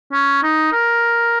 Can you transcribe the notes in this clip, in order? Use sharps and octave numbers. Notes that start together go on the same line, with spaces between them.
C#4
D#4
A#4